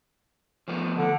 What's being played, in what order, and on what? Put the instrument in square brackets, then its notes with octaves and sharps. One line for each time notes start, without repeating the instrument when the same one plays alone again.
[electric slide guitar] F3 A3 B3
[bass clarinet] D3